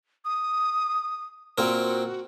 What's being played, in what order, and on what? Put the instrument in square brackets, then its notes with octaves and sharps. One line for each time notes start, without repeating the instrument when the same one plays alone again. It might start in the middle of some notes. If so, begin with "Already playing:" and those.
[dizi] D#6
[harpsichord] A#2 C4 A#4 [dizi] F#4